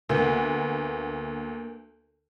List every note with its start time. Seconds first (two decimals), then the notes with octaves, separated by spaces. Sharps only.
0.09 D2 A#3 B3